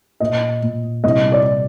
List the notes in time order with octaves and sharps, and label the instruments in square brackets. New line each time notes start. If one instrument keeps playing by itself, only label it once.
[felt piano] A#2 [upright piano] D#5
[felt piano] A#2
[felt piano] C2 [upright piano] D#5
[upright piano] D5